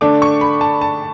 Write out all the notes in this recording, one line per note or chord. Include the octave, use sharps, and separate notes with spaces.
D3 A3 D4 D6
C#6
B5
A5
A5